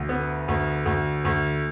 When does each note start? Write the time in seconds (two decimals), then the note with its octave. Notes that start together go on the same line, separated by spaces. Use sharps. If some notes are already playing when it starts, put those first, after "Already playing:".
Already playing: D2
0.09 B3
0.48 D2
0.86 D2
1.25 D2